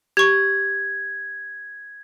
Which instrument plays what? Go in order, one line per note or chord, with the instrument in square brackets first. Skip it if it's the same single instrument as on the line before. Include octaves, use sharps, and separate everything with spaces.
[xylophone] G4 C#6 [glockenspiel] G#6